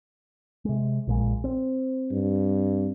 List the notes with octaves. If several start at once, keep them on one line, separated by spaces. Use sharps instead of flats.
C3 G#3
A#1 A#2 G#3
C4
G2